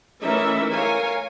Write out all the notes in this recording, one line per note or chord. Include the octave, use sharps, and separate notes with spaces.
E3 A3 C#4 D#4 A#4 E5
A#4 C#5 F5 G#5